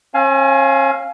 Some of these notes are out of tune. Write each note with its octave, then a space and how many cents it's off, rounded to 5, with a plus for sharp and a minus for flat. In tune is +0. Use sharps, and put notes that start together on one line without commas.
C#4 -40 F5 +0 G#5 +25